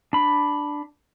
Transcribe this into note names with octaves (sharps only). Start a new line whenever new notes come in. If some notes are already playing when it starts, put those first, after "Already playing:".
D4 B5